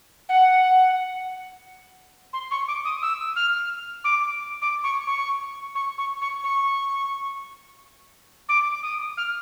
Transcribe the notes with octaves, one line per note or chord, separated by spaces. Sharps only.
F#5
C6
C#6
D6
D#6
E6
F6
D6
D6
C#6
C#6
C#6
C#6
C#6
C#6
D6
D#6
F6